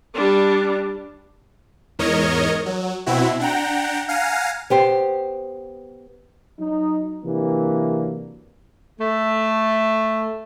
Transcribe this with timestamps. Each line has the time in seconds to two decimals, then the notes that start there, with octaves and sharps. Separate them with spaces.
0.15 G3 D4
1.99 E2 G#2 A#4 C#5 D#5
2.66 F#3
3.06 B2 C4 E4 F#4
3.40 D4 F#5 G5 A#5
4.09 F5 F#5 G#5 A#5
4.70 B3 G4 C5
6.59 F#3 D#4
7.25 C3 E3 F#3 A#3 D4
9.01 A3